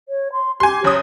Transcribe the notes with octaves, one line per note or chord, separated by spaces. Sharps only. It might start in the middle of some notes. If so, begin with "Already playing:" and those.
C#5
C6
G4 G#5 C6
F#1 C#5 D#6